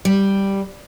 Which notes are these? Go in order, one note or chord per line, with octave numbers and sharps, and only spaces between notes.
G3